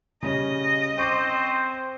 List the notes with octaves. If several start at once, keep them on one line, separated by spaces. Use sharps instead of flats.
C#3 G3 C#4 D#5
C4 C5 C#6 D6